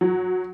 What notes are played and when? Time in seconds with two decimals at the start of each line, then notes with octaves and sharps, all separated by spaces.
0.01 F#3